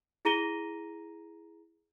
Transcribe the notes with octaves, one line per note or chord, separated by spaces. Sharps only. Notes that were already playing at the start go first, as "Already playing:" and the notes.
E4 G#4 A#5 A#6 D#7 G7